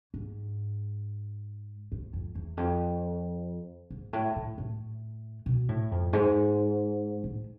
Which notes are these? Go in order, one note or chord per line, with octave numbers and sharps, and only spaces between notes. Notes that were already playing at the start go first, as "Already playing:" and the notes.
G#2
G#2
F2
E2
F2
G#2
A2
A2
A2
B2
A2
F2
G#2
A2